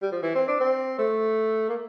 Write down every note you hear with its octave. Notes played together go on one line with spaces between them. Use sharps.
G3
F3
E3
C4
D4
C4
A3
A#3